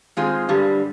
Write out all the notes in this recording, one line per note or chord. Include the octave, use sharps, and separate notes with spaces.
D#3 G#3 C4 F4 G#4
G2 D3 G3